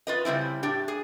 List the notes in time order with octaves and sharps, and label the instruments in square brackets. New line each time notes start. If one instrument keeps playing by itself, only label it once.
[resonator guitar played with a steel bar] F4 B4 D#5
C#3 G3 C4 E4
A2 D4 G4
G#4